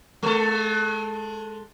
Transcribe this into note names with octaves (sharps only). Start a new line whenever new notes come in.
G#3 A4